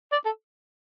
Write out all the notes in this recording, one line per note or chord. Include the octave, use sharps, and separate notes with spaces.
D5
A4